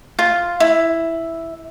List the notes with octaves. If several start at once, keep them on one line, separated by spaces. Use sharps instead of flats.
F4
E4